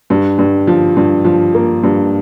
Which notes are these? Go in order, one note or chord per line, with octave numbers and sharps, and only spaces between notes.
G2
G2
F3
G2
F3
A#3
G2